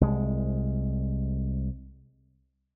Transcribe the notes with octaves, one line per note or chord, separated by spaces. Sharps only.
C2 G#3